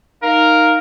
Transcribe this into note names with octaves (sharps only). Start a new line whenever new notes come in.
D#4 A#4 F5